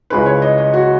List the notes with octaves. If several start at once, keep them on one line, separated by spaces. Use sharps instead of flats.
C#2 C#3 G#3 C#4 E4 B4
C#5
D#5
D#5
F#4